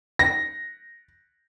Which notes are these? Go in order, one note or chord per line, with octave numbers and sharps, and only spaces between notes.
A#6